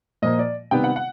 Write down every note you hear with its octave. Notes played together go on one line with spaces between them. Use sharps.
A#2 F3 A#3 D#5
D5
C3 D#3 G3 B3 G5
F#5
F#5